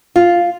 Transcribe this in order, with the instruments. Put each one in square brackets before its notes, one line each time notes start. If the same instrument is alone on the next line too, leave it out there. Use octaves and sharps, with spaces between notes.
[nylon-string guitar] F4